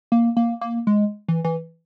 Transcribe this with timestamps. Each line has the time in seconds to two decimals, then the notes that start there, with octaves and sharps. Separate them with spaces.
0.12 A#3
0.37 A#3
0.61 A#3
0.87 G#3
1.28 E3
1.44 E3